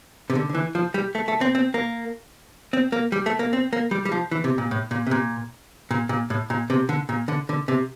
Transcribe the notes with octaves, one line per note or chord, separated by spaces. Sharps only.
C3
D3
D3
E3
F3
G3
A3
A3
C4
C4
A#3
C4
A#3
G3
A3
A#3
C4
A#3
G3
G3
F3
E3
C3
A#2
A2
A#2
C3
A#2
A#2
A#2
A2
A#2
C3
D3
A#2
D3
D3
C3